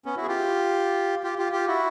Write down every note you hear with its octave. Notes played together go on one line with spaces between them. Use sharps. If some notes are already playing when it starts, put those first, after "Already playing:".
B3 C#4
E4 F#4
G#4
F4 G4
F4 G4
F4 G4
F4 G4
E4 F#4